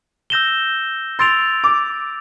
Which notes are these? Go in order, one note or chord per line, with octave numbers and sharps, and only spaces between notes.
E6 G6 A#6 E7 G7
C6 E6 A6 D7 F7
D6